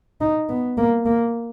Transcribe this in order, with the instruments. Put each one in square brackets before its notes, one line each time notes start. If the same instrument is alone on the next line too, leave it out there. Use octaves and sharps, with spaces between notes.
[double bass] D#4
B3
A#3
A#3